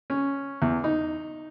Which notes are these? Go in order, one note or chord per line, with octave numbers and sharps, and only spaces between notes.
C#4
E2
D#4